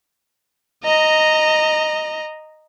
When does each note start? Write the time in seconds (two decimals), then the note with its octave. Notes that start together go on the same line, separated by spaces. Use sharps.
0.84 D#5 A#5